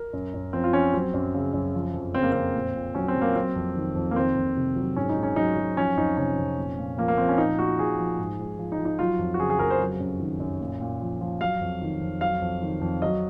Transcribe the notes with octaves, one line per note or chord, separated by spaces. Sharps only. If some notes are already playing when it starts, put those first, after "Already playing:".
Already playing: A#4
F#2
F#2
F3 C4
F4
F3 C#4
F#3 C4
F#2
C#3
F#2
F3
F2
C#3 C4
A#3
F2 C4
A#2
A#2
F#3 C#4
C4
F#3
A#3
F#3 C4
F2
D#3
F2
A#3
D#3 C4
F2
C3
F#3
G#2 C#4
D#4
G#2
C#4
F#3 D#4
F#3
F3 C#4
F2 D#4
C3 C#4
F2
A#2
A#2
F3 A#3
A#3
F3 C4
C#4
A#2 D#4
A#2 F#4
F3 G#4
F3
G#2
G#2
F3
D#4
F3
D#4
F#3 F4
F2
F#4
C#3 G#4
G#4
F2 A#4
C5
F#3
F#2
D#3
F#2
A#2
A#2
F3
F3
F#3 F5
F2
D#3
F2
F#3 F5
F2
D#3
F2
F#3 D#5